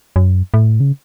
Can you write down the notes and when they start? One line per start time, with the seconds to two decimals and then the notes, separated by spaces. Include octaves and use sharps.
0.16 F#2
0.54 A2
0.80 C#3